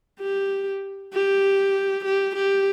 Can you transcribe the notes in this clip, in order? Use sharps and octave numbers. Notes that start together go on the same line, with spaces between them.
G4
G4
G4
G4